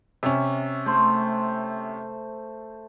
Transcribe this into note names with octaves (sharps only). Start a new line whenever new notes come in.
C3 C#4 E5
A3 C5